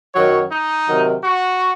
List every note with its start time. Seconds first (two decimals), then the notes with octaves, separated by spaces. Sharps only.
0.15 F#2 D#3 F#3 C#5
0.52 D#4
0.88 C3 D#3 F#3
1.24 F#4